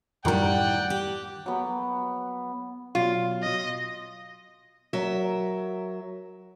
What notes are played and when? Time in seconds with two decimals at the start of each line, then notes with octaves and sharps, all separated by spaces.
0.25 F#2 A2 D#3 G3 A#4 D5 F#5 G5
0.90 G4
1.46 F#3 B3
2.95 B2 F#3 F4
3.42 D#5
4.93 F#3 A#4 E5